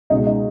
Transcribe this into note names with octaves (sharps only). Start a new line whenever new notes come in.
C#2 B2 G#3 D#4
D#4